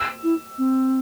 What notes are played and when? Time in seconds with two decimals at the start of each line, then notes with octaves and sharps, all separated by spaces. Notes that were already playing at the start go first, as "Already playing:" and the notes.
Already playing: E6
0.24 E4
0.58 C4